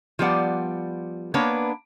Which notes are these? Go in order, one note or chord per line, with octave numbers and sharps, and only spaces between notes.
F3 G3 B3 D5 F#5
A#3 B3 D4 B4 C#5